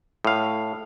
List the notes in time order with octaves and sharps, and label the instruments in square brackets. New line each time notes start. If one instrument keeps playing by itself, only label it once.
[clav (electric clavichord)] A2 F5